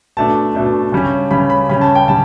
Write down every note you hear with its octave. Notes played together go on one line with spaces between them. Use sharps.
B2 A3 D4 A5
B2 A3 D4
C#3 G3 C#4
C#3 G3 C#4 B5
B5
C#3 G3 C#4 B5
A5
G5
C#3 G3 A5